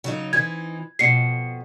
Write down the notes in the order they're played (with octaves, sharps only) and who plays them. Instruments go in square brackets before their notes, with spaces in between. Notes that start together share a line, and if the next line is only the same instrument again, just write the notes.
[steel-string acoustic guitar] C#3 F#3 D#4
[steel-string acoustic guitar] E3 C4 D#4 [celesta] G#6
[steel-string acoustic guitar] F2 B2 [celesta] C7 C#7